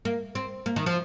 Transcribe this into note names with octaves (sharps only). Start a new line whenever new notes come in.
A#3
C4
A#3
D#3
F3